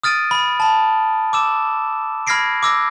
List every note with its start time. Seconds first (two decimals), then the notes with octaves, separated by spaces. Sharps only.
0.03 D#6 F6 A6 D7 D#7
0.31 B5
0.60 A5 B5
1.33 D6 E6 E7
2.27 B5 F6 G#6 A#6 C7 D7
2.63 D6 E6 A#6